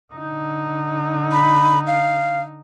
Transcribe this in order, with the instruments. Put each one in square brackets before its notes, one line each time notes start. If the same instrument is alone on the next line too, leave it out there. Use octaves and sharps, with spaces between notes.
[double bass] D3 D#4
[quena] B5
F5